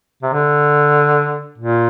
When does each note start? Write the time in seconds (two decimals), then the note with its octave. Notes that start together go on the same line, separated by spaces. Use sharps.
0.23 C3
0.33 D3
1.58 A#2